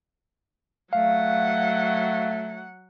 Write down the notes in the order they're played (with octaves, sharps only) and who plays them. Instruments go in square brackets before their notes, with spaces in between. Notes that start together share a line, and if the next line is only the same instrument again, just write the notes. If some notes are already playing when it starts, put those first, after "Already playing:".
[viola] F#3 F#5 [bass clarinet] A3 [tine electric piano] F5